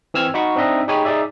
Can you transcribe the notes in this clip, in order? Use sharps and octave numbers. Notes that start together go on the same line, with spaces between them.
E3 C4 E6 F6 G#6
D#4 F#4 B5 C#6
C4 D4 D#4 D#5 E5
D#4 G4 G#4 C#5 G#5 B5
D#4 G#4 D5 E5